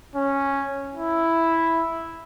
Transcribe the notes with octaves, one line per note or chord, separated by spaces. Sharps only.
C#4
E4